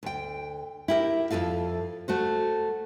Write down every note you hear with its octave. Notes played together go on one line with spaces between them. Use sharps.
D2 G5
E4 G4 A#4
F2 B2 F4 A4 F5
A3 F#4 C5